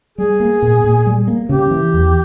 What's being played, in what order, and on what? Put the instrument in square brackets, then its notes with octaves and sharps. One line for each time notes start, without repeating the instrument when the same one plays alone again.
[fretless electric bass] G3 [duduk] G#4
[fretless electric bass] A#3
A#2
A#2
G3
A#3
[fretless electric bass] C#3 [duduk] G4
[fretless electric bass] E3
E2